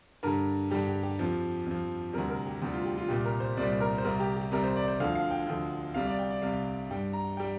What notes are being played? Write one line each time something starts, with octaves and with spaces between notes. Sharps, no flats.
G2 D3 G3 A#4
G2 D3 G3 G4
G4
G4
F2 F3
F2 F3
D2 C3 G3 A#4
A#4
G4
D2 C3 G3 G4
F4
G4
F4
C2 A#2 G3 G4
A#4
C5
C2 A#2 G3 D5
A#4
C5
C2 C3 G3 A#4
G4
G4
C2 C3 G3 A#4
C5
D5
C5
D2 D3 F3 F5
F5
G5
D2 D3 F3 G5
C2 C3 G3 F5
D5
G5
D5
C2 C3 G3 F5
G2 G3 G5
A#5
G3 G5